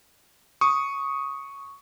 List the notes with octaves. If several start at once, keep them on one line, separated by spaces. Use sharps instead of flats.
C#6 D#6